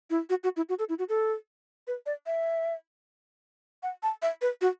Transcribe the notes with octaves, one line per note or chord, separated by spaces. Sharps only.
E4
F#4
F#4
E4
F#4
A4
E4
F#4
A4
B4
D5
E5
F#5
A5
E5
B4
F#4